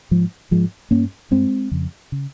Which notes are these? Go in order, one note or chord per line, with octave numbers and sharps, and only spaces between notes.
G#2 F3
G#2 F3 G#3
G2 A#3 C#4
G2 G#3 C4
F2 C#3
C#3